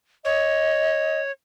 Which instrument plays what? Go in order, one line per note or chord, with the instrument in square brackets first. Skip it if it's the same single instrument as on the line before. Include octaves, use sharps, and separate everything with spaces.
[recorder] C#5 [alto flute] D#5